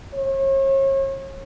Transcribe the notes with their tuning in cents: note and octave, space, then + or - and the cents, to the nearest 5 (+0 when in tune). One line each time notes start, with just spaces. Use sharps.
C#5 -40